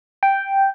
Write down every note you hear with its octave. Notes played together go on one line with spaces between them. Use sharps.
G5